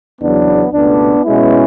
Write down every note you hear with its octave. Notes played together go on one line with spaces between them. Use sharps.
E2 C#3 F#3 B3 D4
C#2 B2 A3 B3 D4
B2 G#3 B3 C#4 E4